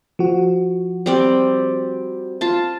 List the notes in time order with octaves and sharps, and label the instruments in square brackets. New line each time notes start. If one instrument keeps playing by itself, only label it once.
[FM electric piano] F3 F#4
[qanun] G3 C4 D5
F4 A5